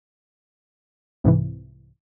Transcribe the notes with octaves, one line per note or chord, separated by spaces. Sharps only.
C2 G#2 C3 E3